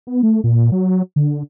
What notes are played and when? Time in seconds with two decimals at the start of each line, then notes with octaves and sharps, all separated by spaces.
0.07 B3
0.23 A3
0.44 A#2
0.72 F#3
1.16 D3